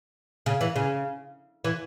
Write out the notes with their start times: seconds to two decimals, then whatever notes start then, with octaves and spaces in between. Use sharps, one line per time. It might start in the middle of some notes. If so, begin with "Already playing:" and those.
0.46 C#3
0.61 E3
0.76 C#3
1.64 E3